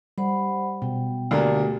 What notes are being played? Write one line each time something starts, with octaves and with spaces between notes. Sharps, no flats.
G3 C5 F#5 B5
B2 G5
D2 A3 A#3 D4 G4 A4